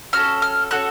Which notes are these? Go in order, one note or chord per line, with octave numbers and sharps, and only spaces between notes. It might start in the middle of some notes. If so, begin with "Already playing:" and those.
C#4 F#4 A4 F6
F6
C#4 F#4 A4 F#6